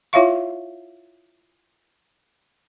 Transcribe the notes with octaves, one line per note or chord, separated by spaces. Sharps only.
E4 F4 C#5 E5 F5 C#6